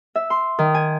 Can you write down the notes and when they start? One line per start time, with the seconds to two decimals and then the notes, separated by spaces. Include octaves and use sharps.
0.15 E5
0.30 C6
0.59 D#3
0.75 G#5